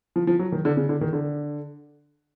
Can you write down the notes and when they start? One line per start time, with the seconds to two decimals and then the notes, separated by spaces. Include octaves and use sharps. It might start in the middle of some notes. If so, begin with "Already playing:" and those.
0.16 F3
0.27 F3
0.39 F#3
0.52 D#3
0.65 D3
0.77 C#3
0.89 D3
1.01 D#3
1.13 D3